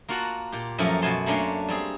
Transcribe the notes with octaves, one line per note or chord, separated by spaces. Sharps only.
A#3 F4 F#4 F#5 A5
A#2 G4
F#2 F3 A3 A#3 C#4
B2 F#4 G#5 A5 C6
A3 A#3 C#4 D4 C6
G3 C4 G#4